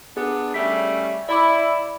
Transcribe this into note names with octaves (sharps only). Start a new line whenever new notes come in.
B3 D4 G#4
G3 A3 C#4 E5 B6
E4 D5 B5 D6